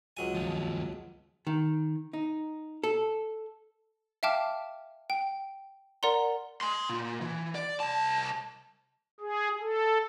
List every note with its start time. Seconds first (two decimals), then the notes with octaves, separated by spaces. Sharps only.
0.17 C#2 F#3 G#5
0.34 D#2 F3
1.47 D#3
2.13 D#4
2.83 A4
4.23 E5 F5 G5 A5 D6 F6
5.10 G5
6.03 A#4 D5 F#5 A#5 C6
6.61 G#5 C6
6.89 A#2
7.21 E3
7.55 D5
7.80 C2 A5
9.21 G#4
9.61 A4